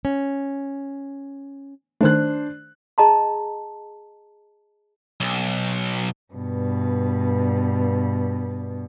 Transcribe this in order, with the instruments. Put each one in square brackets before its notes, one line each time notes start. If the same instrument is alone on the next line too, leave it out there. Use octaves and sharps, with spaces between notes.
[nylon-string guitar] C#4
[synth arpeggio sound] D#3 A3 [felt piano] D4 C5 F#6
[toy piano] G#4 D#5 A5 A#5 C6
[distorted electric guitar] B1
[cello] G2 B2